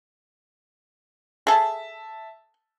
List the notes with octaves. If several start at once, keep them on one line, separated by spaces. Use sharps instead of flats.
G#4 A4 E5 A5